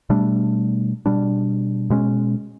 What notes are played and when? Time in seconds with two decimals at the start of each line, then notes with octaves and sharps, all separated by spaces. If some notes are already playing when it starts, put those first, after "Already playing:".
0.10 B2 G3 A3 D4
1.06 B2 G3 D4
1.90 B2 G#3 C#4